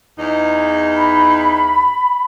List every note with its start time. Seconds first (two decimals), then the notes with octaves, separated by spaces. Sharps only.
0.18 E2 D#4
0.94 B5